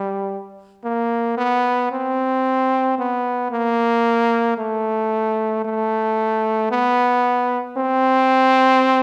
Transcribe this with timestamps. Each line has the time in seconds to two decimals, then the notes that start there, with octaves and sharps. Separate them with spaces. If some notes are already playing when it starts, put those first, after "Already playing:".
Already playing: G3
0.84 A#3
1.37 B3
1.92 C4
2.98 B3
3.51 A#3
4.58 A3
5.65 A3
6.71 B3
7.77 C4